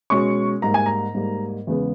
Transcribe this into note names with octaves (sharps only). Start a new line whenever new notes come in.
B2 G#3 C#4 C#6
G#2 G3 A#3 A#5
G#5
A#5
G#2 G3 A#3
E2 C#3 G#3 B3